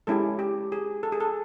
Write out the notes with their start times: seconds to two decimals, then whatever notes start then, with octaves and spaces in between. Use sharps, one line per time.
0.07 G#3 C#4 E4 G4 A4
0.39 G4
0.72 G#4
1.03 A4
1.12 G#4
1.20 A4